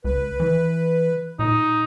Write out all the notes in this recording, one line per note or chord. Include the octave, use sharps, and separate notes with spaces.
C#2 B4
E3
A#2 D#4